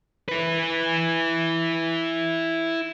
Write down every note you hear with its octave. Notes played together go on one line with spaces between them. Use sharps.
E4 B4